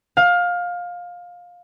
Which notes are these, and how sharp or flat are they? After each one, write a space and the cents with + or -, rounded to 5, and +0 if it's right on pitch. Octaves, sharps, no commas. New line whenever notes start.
F5 +20